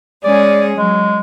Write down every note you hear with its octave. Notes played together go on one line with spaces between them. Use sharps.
G#3 C#4 G#4 D5
F#3 G#3